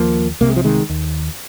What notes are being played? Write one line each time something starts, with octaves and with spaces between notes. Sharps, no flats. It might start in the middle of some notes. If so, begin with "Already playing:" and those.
Already playing: D#2 F3 A#3
C2 C3 A#3
G#3
F3
D#3 G#3
D#2